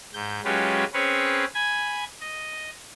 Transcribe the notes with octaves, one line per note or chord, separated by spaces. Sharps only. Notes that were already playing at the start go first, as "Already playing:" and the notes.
G#2 G6
F#3 G#3 C#4 F4 G4 B4
C4 C#4 G#4 B4 C#5
G#5 B5 G#6
D#5